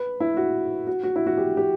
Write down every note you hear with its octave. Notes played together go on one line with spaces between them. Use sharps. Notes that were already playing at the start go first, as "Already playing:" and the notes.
Already playing: B4
E4
F#4
F#4
F#4
E4
F#4
G4
G4